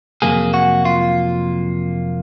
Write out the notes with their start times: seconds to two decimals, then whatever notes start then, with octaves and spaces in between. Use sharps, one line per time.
0.22 F2 C3 D#3 F#3 A#3 G#4
0.54 F#4
0.85 F4